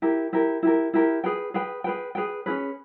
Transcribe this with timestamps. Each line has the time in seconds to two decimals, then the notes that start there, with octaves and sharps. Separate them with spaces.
0.02 E4 G4 A#4
0.33 E4 G4 A#4
0.63 E4 G4 A#4
0.94 E4 G4 A#4
1.24 G#4 B4 G5
1.54 G#4 B4 G5
1.84 G#4 B4 G5
2.15 G#4 B4 G5
2.46 C#4 E4 G#4 B4